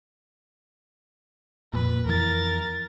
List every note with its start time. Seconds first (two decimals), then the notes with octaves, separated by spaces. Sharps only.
1.74 F2 A#2 B4
2.06 F2 E3 A#4 A6